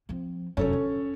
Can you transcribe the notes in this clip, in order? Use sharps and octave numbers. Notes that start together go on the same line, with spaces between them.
F3 C4
F1 F#2 C#4 A4 C#5
D3